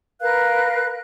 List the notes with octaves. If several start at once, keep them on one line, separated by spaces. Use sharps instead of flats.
A#4 B4 F5 F#6